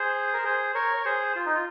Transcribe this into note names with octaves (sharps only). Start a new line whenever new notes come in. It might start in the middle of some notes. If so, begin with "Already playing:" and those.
Already playing: G#4 C5
A#4
G#4 C5
A#4 C#5
C#5
G#4 C5
F4
D#4
F4